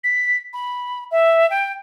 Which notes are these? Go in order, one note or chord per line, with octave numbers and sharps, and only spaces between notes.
B6
B5
E5
G5